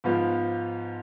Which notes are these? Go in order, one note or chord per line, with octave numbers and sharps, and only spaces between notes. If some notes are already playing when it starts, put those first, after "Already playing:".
G#2 F3 B3 F4